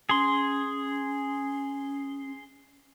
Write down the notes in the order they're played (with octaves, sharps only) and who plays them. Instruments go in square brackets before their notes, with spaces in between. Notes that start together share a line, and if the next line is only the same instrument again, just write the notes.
[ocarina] C#4 [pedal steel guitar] G#4 C6